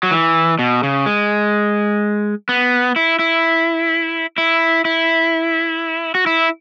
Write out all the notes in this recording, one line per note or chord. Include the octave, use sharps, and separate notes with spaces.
F#3
E3
B2
C#3
G#3
B3
E4
E4
E4
E4
F#4
E4